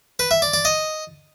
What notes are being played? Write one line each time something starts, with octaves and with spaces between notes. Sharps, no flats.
B4
E5
D5
D5
D#5